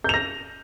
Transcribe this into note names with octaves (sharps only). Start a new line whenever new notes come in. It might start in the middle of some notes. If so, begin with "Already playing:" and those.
G6 A#6 F7